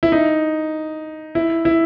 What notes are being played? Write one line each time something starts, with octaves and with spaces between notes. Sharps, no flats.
E4
D#4
E4
E4